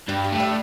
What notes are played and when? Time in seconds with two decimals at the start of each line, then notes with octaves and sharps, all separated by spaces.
0.08 G2 G4
0.24 G4
0.32 A2
0.40 D4